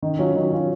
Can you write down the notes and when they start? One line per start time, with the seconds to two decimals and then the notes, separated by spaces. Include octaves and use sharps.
0.02 D#3
0.19 F#3 C#4 F4
0.35 D#3
0.52 F#3 C#4 F4